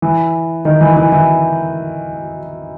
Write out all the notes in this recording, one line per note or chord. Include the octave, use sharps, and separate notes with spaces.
E3
D#3
E3
E3
E3